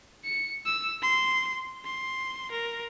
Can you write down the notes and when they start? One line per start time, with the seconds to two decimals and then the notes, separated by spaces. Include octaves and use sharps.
0.25 C#7
0.66 E6
1.02 C6
1.85 C6
2.51 A#4